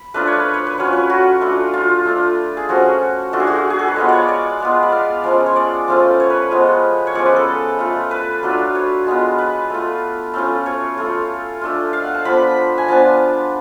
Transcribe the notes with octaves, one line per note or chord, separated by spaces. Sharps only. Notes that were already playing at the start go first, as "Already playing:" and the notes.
Already playing: B5
A3 D4 F4 B4
C#5
B4
C#5
B4
F#3 C#4 F4 C#5
B4
F#4
A3 D4 F4
F4
A3 D4 F4
G#4
F3 A3 C#4 F#4
A3 D4 F4 F#4
G#4
F#4
G#4
A4
B4
G#3 B3 F4 C#5
C#5 D5
D5
G#3 B3 F4
D5
F5
F3 G#3 C#4
C#5
D5
F3 A3 C#4 F4
C#5
B4
F3 G#3 B3
C#5
F3 G#3 C#4 D5
B4
A4
A3 F4
B4
F#3 A3 D4 F4
C#5
G#3 B3 F4
B4
A3 F4
A3 C#4 F4
C#5
A3 F4
A3 D4 F4
F5
F#5
A5
F3 B3 D4 F4 B5
G#5
F3 B3 D4 A5